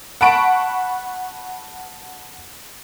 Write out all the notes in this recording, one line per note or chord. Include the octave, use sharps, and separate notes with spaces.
F#5 A5 B5 C#6 D7